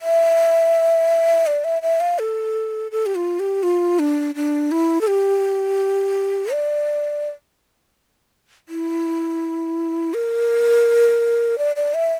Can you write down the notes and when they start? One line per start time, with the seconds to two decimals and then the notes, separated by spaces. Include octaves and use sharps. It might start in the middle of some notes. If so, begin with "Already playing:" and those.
0.02 E5
1.46 D5
1.64 E5
1.82 E5
2.00 F5
2.19 A4
2.91 A4
3.06 G4
3.15 F4
3.39 G4
3.63 F4
3.99 D4
4.35 D4
4.71 E4
5.01 A4
5.07 G4
6.52 D5
8.69 E4
10.14 A#4
11.58 D5
11.76 D5
11.94 E5